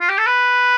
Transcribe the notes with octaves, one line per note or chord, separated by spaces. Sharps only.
F4
G4
A4
B4